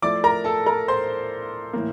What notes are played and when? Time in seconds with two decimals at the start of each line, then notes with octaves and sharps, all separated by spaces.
0.02 F3 A3 E4 D5 D6
0.24 A#4 A#5
0.44 A4 A5
0.66 A#4 A#5
0.88 C5 C6
1.73 A2 E3 A#3